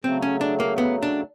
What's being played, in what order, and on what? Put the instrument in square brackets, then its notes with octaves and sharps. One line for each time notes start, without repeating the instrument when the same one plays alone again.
[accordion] C#3 F#3 A3 [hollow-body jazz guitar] C4
[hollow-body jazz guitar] C#4
D4
A#3
B3
D4